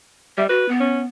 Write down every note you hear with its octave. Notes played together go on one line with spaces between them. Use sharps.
G3 E5
F#4 B4
B3
C#4